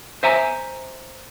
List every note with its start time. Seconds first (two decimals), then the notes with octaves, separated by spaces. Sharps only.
0.23 C5 E5 G#5 A#5